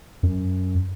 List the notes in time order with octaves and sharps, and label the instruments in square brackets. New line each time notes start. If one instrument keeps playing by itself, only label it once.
[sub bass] F#2